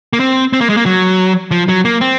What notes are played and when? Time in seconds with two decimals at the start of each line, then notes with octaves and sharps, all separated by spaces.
0.13 A#3
0.20 C4
0.53 C4
0.61 A#3
0.69 G#3
0.77 A#3
0.86 F#3
1.51 F3
1.69 F#3
1.85 A#3
2.01 C4